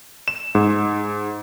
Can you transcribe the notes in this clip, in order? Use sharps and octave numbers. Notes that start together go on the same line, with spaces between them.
E7
G#2